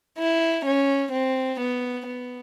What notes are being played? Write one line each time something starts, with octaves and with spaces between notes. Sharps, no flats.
E4
C#4
C4
B3
B3